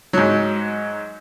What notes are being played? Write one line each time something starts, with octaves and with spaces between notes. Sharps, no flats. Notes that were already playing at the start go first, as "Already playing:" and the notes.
G#2 F#3